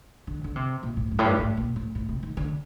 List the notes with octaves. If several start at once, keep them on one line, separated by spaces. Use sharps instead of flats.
D3
D3
C3
A#2
A2
G2
A2
G2
A2
A#2
A2
A2
C3
D#3
D3